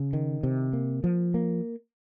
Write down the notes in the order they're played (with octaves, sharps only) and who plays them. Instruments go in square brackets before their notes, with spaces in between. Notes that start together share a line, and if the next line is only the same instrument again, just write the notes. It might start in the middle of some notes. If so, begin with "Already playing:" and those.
Already playing: [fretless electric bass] C#3
D#3
C3
A#3
F3
A#3